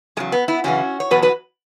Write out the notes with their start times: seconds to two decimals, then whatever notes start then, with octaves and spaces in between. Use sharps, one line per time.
0.17 E2 C#3 F#3 G#3
0.32 B3
0.48 B3 E4
0.64 F#2 C#3 E3 C#4 F#4
1.00 C#5
1.11 E2 B2 F#3 F#4 B4
1.22 F#4 B4